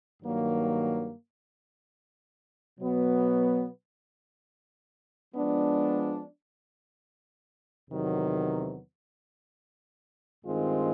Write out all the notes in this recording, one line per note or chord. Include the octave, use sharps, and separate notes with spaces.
G2 D#3 F#3 A#3
B2 F#3 B3
F3 G#3 B3 D4
E2 C3 D#3 F#3 B3
G2 D#3 G#3 C4 F4